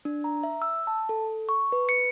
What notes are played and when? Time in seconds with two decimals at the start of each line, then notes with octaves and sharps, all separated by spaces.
0.05 D4
0.24 A#5
0.43 E5
0.62 E6
0.87 A5
1.09 A4
1.49 C#6
1.72 B4
1.89 C#7